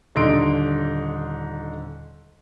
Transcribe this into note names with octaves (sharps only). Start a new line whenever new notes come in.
D#1 D3 D#4 C6 D7